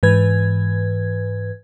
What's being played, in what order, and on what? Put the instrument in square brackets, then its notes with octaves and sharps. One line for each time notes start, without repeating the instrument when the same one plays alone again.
[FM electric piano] G#2 E3 B4 G#6